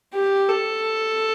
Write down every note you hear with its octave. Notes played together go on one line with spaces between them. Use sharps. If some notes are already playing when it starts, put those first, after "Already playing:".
G4
A4